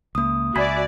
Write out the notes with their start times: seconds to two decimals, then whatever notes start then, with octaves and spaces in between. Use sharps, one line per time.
0.15 C#2 A#3 D#6
0.56 C#2 F#4 D5 E5 G#5 B5 G#6